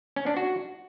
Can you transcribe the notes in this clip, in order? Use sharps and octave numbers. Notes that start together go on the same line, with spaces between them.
C#4
D4
F#4